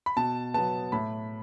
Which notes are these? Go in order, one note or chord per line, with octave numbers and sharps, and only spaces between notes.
B5
B2 A5
F#3 B3 A5
A2 B5